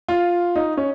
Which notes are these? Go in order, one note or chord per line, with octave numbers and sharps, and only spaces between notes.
F4
D#4
C#4